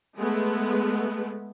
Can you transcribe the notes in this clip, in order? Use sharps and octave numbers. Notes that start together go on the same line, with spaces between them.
G#3 A3 B3